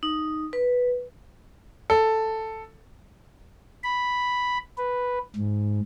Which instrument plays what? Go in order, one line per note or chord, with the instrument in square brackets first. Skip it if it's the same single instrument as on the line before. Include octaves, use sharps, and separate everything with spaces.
[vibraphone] D#4
B4
[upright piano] A4
[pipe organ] B5
B4
G#2